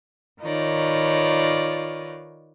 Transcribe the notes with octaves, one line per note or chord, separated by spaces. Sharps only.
D#3 D#4 F4 B4 C#5 D5